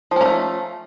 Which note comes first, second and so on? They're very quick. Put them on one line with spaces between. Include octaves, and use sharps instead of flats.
F3 C#4 A#3 A3